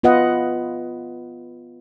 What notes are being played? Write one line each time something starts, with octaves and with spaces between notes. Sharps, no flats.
B3 F4 B4 D#5 F#5